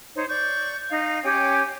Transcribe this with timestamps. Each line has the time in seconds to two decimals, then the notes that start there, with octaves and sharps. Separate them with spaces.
0.15 D#4 C5 C#5
0.28 D5 C#6 G6
0.89 D#4 D#5 F5
1.23 C#4 G4 C#5 G5